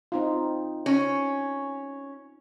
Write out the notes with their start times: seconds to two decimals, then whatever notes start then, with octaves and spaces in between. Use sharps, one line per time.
0.12 C4 D#4 F4
0.86 C#4